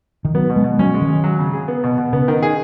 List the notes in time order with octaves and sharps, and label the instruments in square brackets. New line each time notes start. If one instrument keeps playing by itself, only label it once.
[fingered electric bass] D#3
[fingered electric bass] F#3 [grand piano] B3
[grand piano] B2
[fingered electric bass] G#3
[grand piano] B2
[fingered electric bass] F#3 [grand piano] C#4
[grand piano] G#3
[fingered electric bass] D#3
[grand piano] G#3
F#3
C#3
G#4
B3
B2
B2
[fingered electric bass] C#3 [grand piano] B3
[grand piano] D#3
G#4